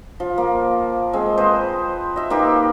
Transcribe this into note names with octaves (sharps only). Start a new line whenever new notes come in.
F3
A#3
G#3 C4
B4 C5 D#5 G5
D#5 E5
A#3 D#4 G4 B4